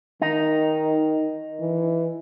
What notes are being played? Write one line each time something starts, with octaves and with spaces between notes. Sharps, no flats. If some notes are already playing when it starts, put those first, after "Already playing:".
D#3 D#4
E3